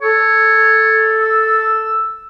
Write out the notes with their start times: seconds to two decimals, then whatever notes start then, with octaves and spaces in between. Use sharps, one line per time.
0.02 A4 C#5
1.21 E6